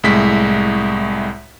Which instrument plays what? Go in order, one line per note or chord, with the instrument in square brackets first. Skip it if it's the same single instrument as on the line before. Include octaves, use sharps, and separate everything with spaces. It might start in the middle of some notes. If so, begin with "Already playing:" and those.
[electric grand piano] C2 A2 G#3 B6